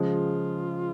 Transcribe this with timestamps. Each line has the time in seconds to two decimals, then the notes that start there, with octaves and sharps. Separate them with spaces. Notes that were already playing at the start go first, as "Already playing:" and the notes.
Already playing: C#3 F3 G#3
0.12 F4